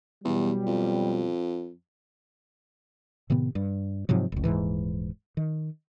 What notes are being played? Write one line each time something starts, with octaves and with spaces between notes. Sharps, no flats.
E2 B2 F#3 G3
F2
A2 C3 D#3 B3
G2
G#2 C3 F3 F#3
F1 C#2
D#1 B1 G#2 E3
D#3